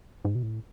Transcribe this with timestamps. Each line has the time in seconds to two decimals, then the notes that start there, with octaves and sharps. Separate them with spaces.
0.25 G#2
0.35 B2
0.43 A2